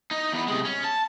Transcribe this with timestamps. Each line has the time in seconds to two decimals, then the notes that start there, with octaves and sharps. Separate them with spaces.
0.11 D#4
0.32 E2 B3
0.48 C3 G#3
0.65 C#4
0.84 A5